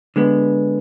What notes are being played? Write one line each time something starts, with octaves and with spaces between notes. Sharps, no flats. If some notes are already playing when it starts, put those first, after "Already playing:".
D3 G#3 B3